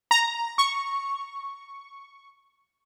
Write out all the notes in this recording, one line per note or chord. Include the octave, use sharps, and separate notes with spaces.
A#5
C#6